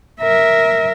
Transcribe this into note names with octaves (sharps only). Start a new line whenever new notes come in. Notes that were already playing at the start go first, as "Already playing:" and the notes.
A#4 E5